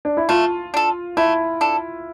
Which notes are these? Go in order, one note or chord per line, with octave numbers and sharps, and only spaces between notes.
D4
E4
A3 F4
D4 A4
A3 E4
D4 A4